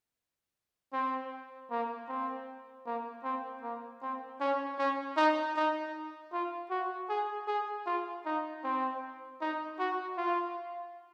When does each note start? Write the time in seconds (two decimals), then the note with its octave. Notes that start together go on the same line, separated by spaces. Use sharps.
0.93 C4
1.71 A#3
2.09 C4
2.86 A#3
3.24 C4
3.62 A#3
4.02 C4
4.41 C#4
4.79 C#4
5.17 D#4
5.56 D#4
6.32 F4
6.70 F#4
7.09 G#4
7.48 G#4
7.86 F4
8.26 D#4
8.64 C4
9.41 D#4
9.79 F#4
10.17 F4